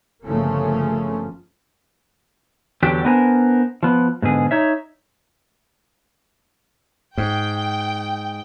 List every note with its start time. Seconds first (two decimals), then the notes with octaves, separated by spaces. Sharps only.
0.25 G1 C#3 F3 A3 A#3 C#4
2.83 E2 D3 F#3 D4 G4
3.05 B3 D4 A#4 C5 G#5
3.83 F3 B3
4.22 G#2 B2 D3 G#4
4.51 D#4 C#5 E5
7.18 G#2 G5